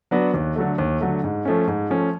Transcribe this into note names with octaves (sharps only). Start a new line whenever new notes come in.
F#3 B3 D4 F#4
D#2
D3 F#3 A3
D#2
D3 F#3 A3
G#2
F3 A3 C#4
G#2
F3 A3 C#4